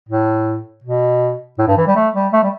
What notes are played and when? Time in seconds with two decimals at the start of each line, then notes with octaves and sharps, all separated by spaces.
0.08 A2
0.84 B2
1.58 A2
1.67 G2
1.77 E3
1.87 G3
1.95 A3
2.15 G3
2.33 A3
2.43 G3